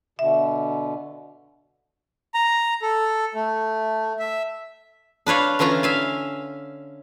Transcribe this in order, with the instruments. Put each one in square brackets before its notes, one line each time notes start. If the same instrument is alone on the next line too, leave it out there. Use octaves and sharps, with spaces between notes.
[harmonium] B2 D3 [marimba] E5
[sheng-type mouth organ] A#5
A4
A3
E5
[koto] D4 B4 C#5 F5
D3 E3 C#4 F4 A#5
E5 F5 G#5